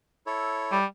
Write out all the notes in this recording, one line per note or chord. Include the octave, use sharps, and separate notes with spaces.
E4 A4 C#5
G3